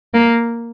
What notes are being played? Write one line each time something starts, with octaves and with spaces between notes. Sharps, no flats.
A#3